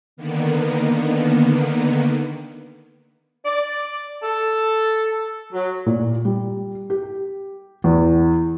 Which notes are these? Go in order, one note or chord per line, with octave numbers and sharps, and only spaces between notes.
D3 D#3 A#3 B3
D5
A4
F#3
A#2
G3
G4
E2